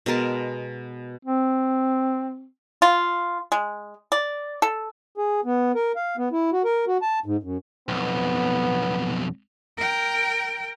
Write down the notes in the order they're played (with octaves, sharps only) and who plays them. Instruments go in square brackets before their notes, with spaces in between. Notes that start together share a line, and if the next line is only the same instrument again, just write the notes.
[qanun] B2 G#3 A#4 A5
[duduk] C4
[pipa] F4
G#3
D5
A4
[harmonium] G#4
B3
A#4
F5
B3
E4
F#4
A#4
F#4
A5
G#2
F#2
[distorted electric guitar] B1 F2 [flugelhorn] B3
[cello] A#4 G5